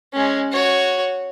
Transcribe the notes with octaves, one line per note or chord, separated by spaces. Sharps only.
G#3 C#4
F#4 C#5